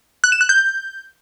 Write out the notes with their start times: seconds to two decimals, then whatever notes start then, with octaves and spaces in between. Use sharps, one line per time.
0.24 F#6
0.32 E7
0.41 F#6
0.49 G6